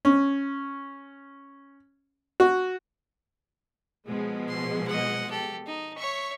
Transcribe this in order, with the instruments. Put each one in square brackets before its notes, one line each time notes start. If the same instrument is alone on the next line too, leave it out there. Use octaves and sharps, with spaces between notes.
[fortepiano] C#4
F#4
[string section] B2 F3 G#3
[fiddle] C6
D#5 F#5
G4 A4
D#4
[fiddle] C#5 E5 [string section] C#6